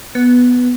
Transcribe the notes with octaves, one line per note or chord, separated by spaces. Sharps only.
B3